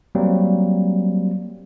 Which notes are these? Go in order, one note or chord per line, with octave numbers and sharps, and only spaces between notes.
F#3 G3 A#3 C4